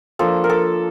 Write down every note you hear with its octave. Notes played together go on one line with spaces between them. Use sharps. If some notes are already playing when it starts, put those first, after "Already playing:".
F3 A#3 D4 A4
A#4
A4